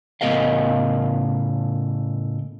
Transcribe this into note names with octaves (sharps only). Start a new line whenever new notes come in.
A2 C#3 B3 A#4 D#5 F5